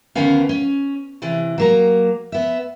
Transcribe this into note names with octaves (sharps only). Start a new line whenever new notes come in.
D2 D3 D#3 B3 C#4 F5
C#4
C3 E3
F#3 A#3 A#5
B3 E5